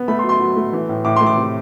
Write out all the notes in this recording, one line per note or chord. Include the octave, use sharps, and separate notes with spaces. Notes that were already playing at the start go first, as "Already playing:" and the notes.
Already playing: B3
A3 B5
C6
F#3
C6
F#3
A3
E3
A2
A2 D6
C6
A3
D6
C3